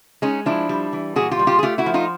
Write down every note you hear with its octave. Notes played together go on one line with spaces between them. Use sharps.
G#3 C#4 D#4
F3 D4 E4
G3
E3
A#2 F#4 G#4
F4 G4
G3
F4 G4
G#4
A3 F4 G4
E4 F#4
F3
D#4 F4